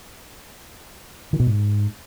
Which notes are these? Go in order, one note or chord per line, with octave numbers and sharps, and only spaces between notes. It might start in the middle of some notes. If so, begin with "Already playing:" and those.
D#3
B2
G#2